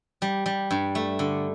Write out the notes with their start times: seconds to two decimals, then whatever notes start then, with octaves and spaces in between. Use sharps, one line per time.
0.22 G3
0.46 G3
0.71 G2
0.95 A3
1.19 D3